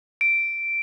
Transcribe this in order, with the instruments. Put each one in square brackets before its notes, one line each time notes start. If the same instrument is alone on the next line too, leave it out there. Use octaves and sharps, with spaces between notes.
[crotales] D7